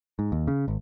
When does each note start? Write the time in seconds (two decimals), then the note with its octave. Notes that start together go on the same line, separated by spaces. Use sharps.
0.19 G#2
0.32 D#2
0.48 C#3
0.68 G#1